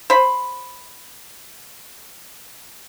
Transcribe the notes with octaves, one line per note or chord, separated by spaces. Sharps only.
C5 B5